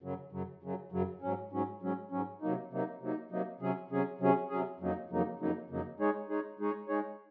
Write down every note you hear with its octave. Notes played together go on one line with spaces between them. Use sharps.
F#2 C#3 F#3
F#2 C#3 F#3
F#2 C#3 F#3
F#2 C#3 F#3
G#2 F#3 C#4
G#2 F#3 C#4
G#2 F#3 C#4
G#2 F#3 C#4
C3 F#3 A#3 D#4
C3 F#3 A#3 D#4
C3 F#3 A#3 D#4
C3 F#3 A#3 D#4
C3 F#3 C#4 G#4
C3 F#3 C#4 G#4
C3 F#3 C#4 G#4
C3 F#3 C#4 G#4
F2 C#3 F#3 A#3 D#4
F2 C#3 F#3 A#3 D#4
F2 C#3 F#3 A#3 D#4
F2 C#3 F#3 A#3 D#4
G#3 D#4 G#4 C#5
G#3 D#4 G#4 C#5
G#3 D#4 G#4 C#5
G#3 D#4 G#4 C#5